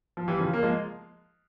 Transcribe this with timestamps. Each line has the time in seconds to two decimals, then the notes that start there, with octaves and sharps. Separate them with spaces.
0.17 F3
0.28 E3 G3
0.39 C#3 F3
0.53 A#3
0.63 F3 G#3